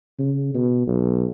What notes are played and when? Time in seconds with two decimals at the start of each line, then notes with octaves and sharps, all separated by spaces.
0.19 C#3
0.54 B2
0.87 B1